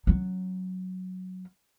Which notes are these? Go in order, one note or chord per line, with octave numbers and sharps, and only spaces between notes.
F#3 C#4